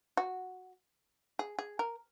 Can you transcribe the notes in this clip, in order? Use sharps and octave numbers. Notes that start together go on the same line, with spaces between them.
F#4
G#4
G#4
A#4